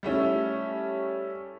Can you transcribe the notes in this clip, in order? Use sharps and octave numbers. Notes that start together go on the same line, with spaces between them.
G3 A3 C#4 E4